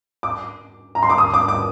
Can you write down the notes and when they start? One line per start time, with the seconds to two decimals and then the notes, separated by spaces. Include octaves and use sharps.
0.23 D6
0.95 A#5
1.03 C6
1.10 D6
1.18 D#6
1.34 D6
1.48 D6